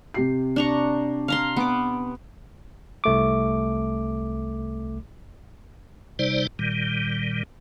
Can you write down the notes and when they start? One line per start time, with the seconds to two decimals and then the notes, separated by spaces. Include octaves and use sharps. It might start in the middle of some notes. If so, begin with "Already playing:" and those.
0.14 C3 G4 C7
0.56 D4 A#5 C#6
1.28 F5 A#5 C6
1.57 B3 D6
3.04 C2 A3 D6
6.19 C3 G3 D#4 C5 D5
6.59 A#2 D#3 G3